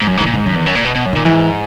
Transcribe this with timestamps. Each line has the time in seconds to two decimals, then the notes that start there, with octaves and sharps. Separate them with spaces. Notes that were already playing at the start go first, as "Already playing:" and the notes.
0.02 G#2
0.07 F#2 F#3
0.17 G#2 E3
0.27 A#2
0.34 G#2 D#3
0.46 F#2 D#3
0.55 E2
0.66 F#2
0.75 A#2
0.85 B2
0.95 B2
1.06 F#2
1.13 A#2 D#3
1.25 G#2 E3